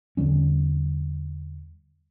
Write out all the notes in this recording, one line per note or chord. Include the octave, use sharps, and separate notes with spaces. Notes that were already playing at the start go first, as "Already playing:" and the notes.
E2 D3 G3 C#4